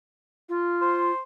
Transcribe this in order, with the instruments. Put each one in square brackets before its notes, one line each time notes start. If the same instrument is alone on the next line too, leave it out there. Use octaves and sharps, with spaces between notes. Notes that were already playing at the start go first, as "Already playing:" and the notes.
[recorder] F4
[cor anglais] C5